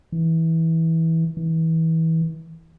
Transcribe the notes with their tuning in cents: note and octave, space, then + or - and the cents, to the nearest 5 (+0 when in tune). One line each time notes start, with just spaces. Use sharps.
E3 -20
E3 -30